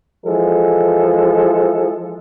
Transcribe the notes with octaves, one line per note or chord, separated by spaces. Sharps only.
E3 F3 G#3 A4